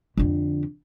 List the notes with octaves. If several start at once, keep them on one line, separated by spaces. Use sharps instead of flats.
F2 D3